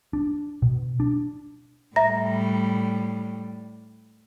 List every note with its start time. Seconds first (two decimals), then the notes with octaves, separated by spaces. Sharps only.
0.13 D4
0.62 B2
1.00 D4
1.96 A2 G3 E5 A#5 A#6